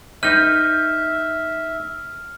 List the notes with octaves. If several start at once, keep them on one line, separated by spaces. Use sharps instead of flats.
D#4 B4 E5 F6 G6